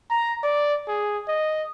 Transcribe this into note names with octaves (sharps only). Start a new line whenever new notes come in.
A#5
D5
G#4
D#5